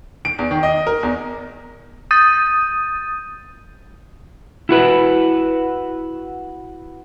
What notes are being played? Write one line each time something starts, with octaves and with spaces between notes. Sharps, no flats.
D7
E2
D#3
D#5
A#4
E2
D#6 G6 A6 D#7
E4 F#4 B4